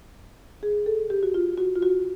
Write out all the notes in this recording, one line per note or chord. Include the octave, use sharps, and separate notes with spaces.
G#4
A4
G4
F#4
F4
F#4
F4
F#4